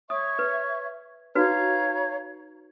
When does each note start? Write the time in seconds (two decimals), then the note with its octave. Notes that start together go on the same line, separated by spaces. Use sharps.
0.10 C#5 E5 C#6 D#6
0.39 B4
1.35 D#4 F#4 B4 C#5 F5 A#5